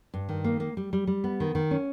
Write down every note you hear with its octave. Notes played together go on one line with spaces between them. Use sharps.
G2
D#3
A#3
A#3
G3
G3
G3
B3
D#3
D#3
C#4